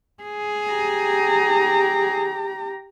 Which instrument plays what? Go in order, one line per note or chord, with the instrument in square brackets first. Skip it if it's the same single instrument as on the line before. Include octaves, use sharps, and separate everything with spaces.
[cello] G#4
[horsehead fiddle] G4 A#5